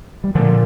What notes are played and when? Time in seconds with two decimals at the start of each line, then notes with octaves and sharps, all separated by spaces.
0.24 G3
0.34 A#2 D3 F3